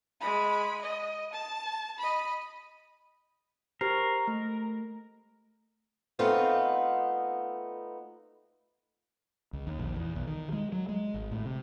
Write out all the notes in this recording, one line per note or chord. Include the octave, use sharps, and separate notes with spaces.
G#3 B5
D#5
A5
D#5 B5
G4 A#4 C5 C7
A3
A3 B3 C4 D#4 F4 F5
C#2
D#2
A#1
E2
B1
D#3
G#3
F#3
G#3
G#1
A2
C3